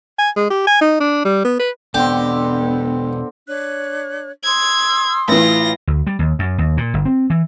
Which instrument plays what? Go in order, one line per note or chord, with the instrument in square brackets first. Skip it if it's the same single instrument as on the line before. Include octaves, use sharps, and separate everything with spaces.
[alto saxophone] G#5
G#3
G4
G#5
D#4
D4
G3
B3
B4
[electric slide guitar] E2 B2 [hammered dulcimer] D3 C4 [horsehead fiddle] B3 [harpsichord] G4
[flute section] D4 C#5 F#6
[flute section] C6 D#6 E6 [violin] G#6
[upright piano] A1 E3 [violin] F4 A#6
[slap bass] D2
G3
D#2
F#2
D#2
A#2
G1
C4
E3